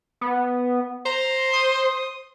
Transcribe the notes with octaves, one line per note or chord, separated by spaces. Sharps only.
B3
C5 A#5
D#6